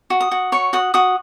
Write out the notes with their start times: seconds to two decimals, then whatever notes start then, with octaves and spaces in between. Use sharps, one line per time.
0.10 F#4
0.21 D#6
0.31 F#4
0.52 C#5 C#6
0.73 F#4 D#6
0.94 F#4 D#6